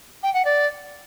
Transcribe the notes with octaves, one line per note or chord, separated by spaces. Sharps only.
G5
F#5
D5